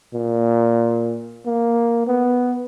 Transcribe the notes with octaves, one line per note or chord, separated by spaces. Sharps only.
A#2
A#3
B3